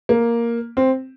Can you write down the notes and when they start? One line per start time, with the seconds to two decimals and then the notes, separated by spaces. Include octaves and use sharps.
0.09 A#3
0.77 C4